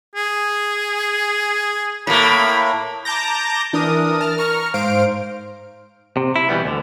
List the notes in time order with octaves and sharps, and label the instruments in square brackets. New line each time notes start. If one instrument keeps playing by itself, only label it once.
[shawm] G#4
[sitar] A2 A#3 [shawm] B5
[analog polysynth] A5 A#5 D6 G6 A#6
E3 D4 A#4 D#6
A#4 A5 F6
A#5 C#6 F6
G#2 C5 F5 D7
[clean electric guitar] C3
E4
B2 E3 G3 B3
D2 D3